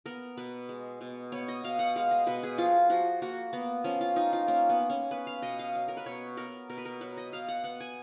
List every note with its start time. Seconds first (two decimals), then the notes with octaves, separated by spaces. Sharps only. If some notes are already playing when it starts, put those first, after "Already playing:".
0.06 B3 A#4
0.37 B2 B4
0.69 G#3
1.01 B2
1.32 B3 C#5
1.48 D#5
1.64 B2 F5
1.79 F#5
1.96 G#3 F5
2.11 D#5
2.26 B2 B4
2.43 G#4
2.58 F3 F4
2.89 F3 F#4
3.22 A#3 F#4
3.53 A#3 B3
3.84 F3 C#4
4.01 F4
4.16 F3 D#4
4.33 F4
4.48 A#3 C#4
4.69 B3
4.80 A#3
4.90 C#4
5.11 B3 B4
5.27 F5
5.42 B2 D#5
5.59 F5
5.75 F#3
5.88 A#4
5.97 B4
6.06 B2 C#5
6.37 B3 A#4
6.69 B2 A#4
6.78 B4
6.85 A#4
7.01 F#3 B4
7.17 D#5
7.32 B2 F5
7.48 F#5
7.64 B3 F#5
7.80 G#5